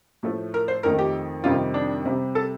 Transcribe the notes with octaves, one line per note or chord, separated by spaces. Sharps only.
A2 F3 A3
A#4
C5
F2 D#3 A3 A#4
G4
F2 C3 D#3 G3 F4
D4
C3 G3
A4